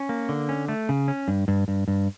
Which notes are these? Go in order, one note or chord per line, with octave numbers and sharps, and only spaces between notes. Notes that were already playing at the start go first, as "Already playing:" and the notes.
Already playing: C#4
A#3
D3
C#4
A3
C#3
C#4
G2
G2
G2
G2